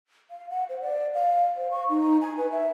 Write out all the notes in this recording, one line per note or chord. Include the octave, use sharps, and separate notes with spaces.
F5
F#5
C5
D5
F5
C5
C#6
D#4
G#5
B4
E5